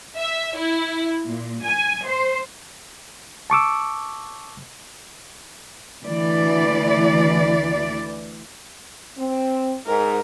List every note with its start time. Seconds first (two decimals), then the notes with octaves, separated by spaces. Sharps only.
0.17 E5
0.57 E4
1.26 A#2
1.63 G#5
2.06 C5
3.50 A5 C#6 D6 E6
6.04 D2 E3 D5
9.17 C4
9.86 G#2 A#4